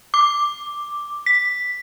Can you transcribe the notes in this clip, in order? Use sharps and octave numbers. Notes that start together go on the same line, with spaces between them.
D6
B6